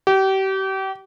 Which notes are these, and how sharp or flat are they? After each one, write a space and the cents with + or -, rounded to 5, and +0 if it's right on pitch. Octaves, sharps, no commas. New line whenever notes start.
G4 -35